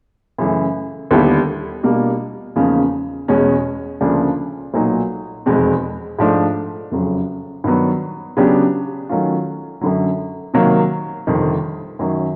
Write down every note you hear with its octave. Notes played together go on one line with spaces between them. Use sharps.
F#2 C#3 E3 A3
D#2 D3 G3 B3 E4
B2 G3 A#3 D4 F4
E2 C#3 F3 A#3 D#4
E2 B2 G#3 C#4
D2 C#3 F3 A#3 D4
B1 A#2 F#3 B3 D#4
F1 E2 B2 G#3 C4
G#2 F3 A3 D4
F#1 F2 C#3 F#3
G2 D#3 F#3 B3
C#3 F#3 B3 D4 G4
D#3 F#3 A3 C#4 F4
F#2 D3 F#3
C3 D#3 F#3 A#3
G1 F2 C3 D#3
F#2 D#3 F#3